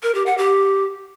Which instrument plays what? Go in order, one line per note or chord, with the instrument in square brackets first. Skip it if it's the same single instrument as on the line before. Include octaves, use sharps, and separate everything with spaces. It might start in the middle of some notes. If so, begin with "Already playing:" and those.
[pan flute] A#4
G4
F#5
G4